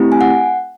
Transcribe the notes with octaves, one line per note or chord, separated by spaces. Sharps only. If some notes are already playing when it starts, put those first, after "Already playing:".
Already playing: A3 C4 E4 G4
G#5
F#5